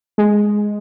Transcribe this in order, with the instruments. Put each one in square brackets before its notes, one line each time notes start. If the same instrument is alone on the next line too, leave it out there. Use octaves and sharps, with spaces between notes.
[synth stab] G#3